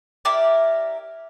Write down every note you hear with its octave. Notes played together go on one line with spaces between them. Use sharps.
E4 G4 A#4 D5